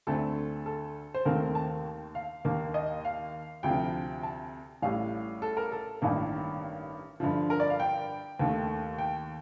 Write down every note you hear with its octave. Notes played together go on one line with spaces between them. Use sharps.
D2 D3 A3 C4 A4
A4
C5
D#2 D#3 A3 C4 A#4
A5
F5
D#2 D#3 A#3
D#5
F5
D2 C3 F3 G5
A5
A1 A2 G3 F5
A4
A#4
A4
A1 G2 D#3 A#3
G2 D3 F3
A#4
D5
F5
G5
D#2 D#3 A3
G5